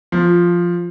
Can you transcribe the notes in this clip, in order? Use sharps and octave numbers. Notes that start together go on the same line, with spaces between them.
F3